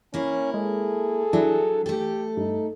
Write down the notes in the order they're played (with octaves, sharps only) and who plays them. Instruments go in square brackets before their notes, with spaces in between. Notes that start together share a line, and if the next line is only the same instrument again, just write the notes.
[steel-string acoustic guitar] A#3 E4 [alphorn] C#4
[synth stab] G#3 [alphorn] G#4 [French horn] A4
[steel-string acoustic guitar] F#3 [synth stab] D4 E4
[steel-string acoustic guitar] A3 A4 [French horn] G4
[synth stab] G2 [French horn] D#4